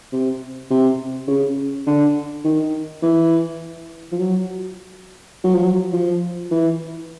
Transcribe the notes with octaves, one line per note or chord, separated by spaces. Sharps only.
C3
C3
C#3
D3
D#3
E3
F3
F#3
F#3
F3
F#3
F3
E3